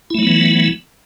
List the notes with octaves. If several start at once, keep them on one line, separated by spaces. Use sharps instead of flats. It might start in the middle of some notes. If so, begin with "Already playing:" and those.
E3 F#3 A3 B3 E4